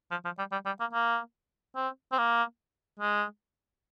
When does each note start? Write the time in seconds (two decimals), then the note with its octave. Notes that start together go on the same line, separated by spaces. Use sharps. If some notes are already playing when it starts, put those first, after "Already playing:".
0.11 F3
0.25 F3
0.38 G3
0.52 G3
0.66 G3
0.80 A#3
0.93 A#3
1.76 C4
2.12 C4
2.18 A#3
2.99 G#3